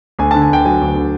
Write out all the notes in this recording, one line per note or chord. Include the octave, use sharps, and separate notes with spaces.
D2 G#5
A5
D3
G#5
D2 G5
F#3 G#5
D2
D3